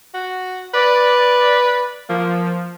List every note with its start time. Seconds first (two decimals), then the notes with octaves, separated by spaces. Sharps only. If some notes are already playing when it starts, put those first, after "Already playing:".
0.14 F#4
0.74 B4 D5
2.09 F3 A#3